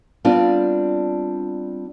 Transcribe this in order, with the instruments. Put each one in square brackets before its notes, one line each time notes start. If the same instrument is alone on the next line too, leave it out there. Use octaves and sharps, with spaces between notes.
[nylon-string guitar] G3 B3 C4 D4 F4 D5